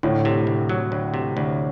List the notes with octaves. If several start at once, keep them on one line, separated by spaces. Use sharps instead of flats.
D2 A2
C3
D2
F#3
D2
C3
D2